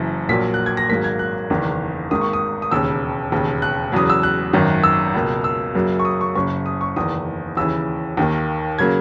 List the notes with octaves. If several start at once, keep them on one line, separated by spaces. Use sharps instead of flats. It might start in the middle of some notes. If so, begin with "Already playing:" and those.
Already playing: F#1 F#2 E3
A#1 A#2 F#3 A#3 B6
F#6
G#6
A#6
G#1 G#2 F#3 A#3 B6
G#6
F#6
F#1 E2 D#3
G#1 G#2 D#3 A#3 D#6
C#6
D#6
D#6
E1 D#2 C#3 E6
E1 D#2 C#3
F#6
E2 C#3 F#3 D#6
E6
F#6
G#1 F#2 D#3
E6
C#2 B2 A#3
E6
F#2 C#3 F#3 A#3
C#6
D#6
C#6
F#1 F#2 C#3 C#6
D#6
C#6
F#1 E2 D#3 D#6
D#2 C#3 E3 E6
D#2 D#3 A#3
C#3 F#3 A#3 G#6